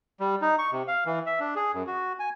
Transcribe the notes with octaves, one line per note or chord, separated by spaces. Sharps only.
G3
D#4
C#6
C3
F5
E3
E5
D4
G#4
F#2
F#4
G#5